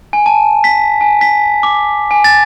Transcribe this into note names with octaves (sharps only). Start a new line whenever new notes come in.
G#5
A5
B6
G#5
B6
D6
G#5
A6